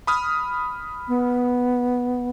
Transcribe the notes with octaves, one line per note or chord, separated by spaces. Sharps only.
B5 D#6 F6
B3